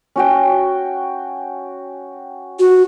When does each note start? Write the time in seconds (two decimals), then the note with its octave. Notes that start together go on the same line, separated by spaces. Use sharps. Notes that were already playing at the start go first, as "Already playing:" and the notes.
0.16 C#4 F#4 G5
2.59 F#4